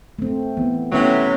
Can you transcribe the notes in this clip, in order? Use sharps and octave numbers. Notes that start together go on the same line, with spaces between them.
A3 C4
E3 B3
C3 E3 F#3 A3 B3 C#4